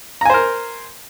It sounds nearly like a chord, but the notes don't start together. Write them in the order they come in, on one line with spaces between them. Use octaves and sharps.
A#5 G#5 C5 A#4